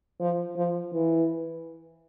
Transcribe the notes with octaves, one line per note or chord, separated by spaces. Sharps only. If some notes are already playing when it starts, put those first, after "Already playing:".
F3
F3
E3